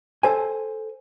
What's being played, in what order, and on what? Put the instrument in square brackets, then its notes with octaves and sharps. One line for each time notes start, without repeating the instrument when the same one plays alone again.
[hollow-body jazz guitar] A4 C5 G#5